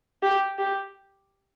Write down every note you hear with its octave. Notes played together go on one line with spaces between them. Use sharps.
G4
G4